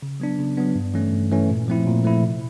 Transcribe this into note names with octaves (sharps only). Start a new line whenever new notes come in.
C#3
F#3 B3 D4
C#3
F#3 B3 D4
G2
E3 A3 C#4
G2
E3 A3 C#4
A#2
F3 A3 C4 E4
A#2
F3 A3 C4 E4
C3